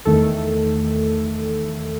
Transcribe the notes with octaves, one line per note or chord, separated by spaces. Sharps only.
E2 D#3 A3 A4